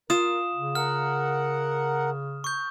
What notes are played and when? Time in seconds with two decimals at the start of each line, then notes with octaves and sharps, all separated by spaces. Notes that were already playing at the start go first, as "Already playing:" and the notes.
0.10 F4 A#4 D#6 E7
0.54 C#3
0.75 A#4 F#5 F6
2.44 C#6 G6